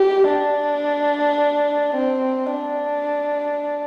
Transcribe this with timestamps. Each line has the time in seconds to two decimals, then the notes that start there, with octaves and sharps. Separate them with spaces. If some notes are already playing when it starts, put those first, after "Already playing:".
Already playing: G4
0.27 D4
1.95 C4
2.51 D4